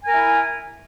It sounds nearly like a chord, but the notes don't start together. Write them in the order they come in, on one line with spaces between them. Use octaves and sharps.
G#5 A#4 E4